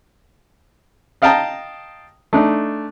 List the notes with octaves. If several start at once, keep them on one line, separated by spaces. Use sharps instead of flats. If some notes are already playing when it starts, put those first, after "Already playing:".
D#5 F5 G5 A5 A#5 D#6
A3 D4 D#4